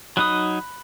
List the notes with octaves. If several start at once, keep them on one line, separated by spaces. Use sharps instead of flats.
F#3 D#4 B5 D#6 F#6